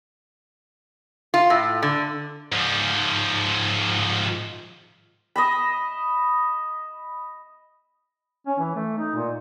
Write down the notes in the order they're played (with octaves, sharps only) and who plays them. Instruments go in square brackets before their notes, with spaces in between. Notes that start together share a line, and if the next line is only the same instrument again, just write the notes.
[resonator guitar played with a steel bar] F4
A2
D3
[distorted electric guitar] G#2 F3
[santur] D#5 E5 B5
[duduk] C#4
E3
A3
D#4
A#2